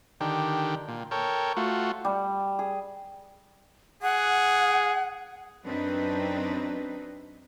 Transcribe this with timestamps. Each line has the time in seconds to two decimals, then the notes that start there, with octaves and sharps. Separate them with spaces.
0.21 D3 D#3 G4
0.88 A#2
1.11 A4 A#4 C#5 G5
1.56 A3 F4 F#4
2.05 G3
2.59 G#4
4.03 G#4 F#5
5.65 F#2 C4 D4 D#4 B4